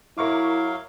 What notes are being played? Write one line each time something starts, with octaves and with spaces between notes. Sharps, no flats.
F#3 E4 A#4 F5 C#6 D6